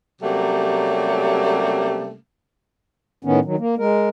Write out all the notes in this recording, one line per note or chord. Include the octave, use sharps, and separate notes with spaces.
C3 F#3 G3 A3 A#3 C#4
A2 D#3 B3 C#4
D#3 F#3
A#3
G#3 A#4